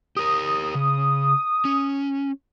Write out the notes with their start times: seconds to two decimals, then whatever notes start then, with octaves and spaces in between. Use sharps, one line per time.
0.17 G4 A#4 D#6
0.75 C#3
1.65 C#4